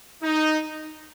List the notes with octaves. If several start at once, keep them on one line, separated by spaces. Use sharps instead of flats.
D#4